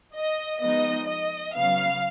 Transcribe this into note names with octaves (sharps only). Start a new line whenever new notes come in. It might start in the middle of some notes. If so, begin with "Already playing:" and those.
D#5
F3 G#3 B3 D#4 D#5
D#5
C#3 F#3 B3 F5